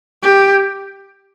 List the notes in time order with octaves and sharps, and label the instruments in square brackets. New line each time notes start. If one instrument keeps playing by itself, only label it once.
[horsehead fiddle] G4